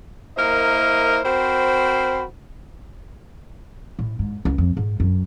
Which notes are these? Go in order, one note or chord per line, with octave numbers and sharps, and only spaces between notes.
A#3 E4 A#4 C5 D#5
C4 F#4 A#4 C5 B5
A2
G#2
C#2
F2
G#2
F#2